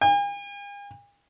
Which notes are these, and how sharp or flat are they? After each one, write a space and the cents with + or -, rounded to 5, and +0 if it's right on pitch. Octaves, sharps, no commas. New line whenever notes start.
G#5 -45